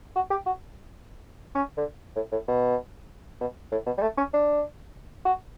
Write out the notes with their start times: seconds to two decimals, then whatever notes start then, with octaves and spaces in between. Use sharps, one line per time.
0.16 F#4
0.30 G4
0.46 F#4
1.55 C#4
1.77 D3
2.16 A2
2.32 A2
2.48 B2
3.41 B2
3.72 A2
3.86 B2
3.98 G3
4.02 A3
4.17 C#4
4.33 D4
5.25 F#4